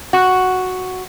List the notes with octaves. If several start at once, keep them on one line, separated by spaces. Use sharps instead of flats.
F#4